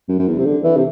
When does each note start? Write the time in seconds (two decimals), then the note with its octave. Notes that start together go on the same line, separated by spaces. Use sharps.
0.09 F#2
0.19 F#2
0.27 E2
0.38 C3
0.45 D3
0.64 E3
0.77 C3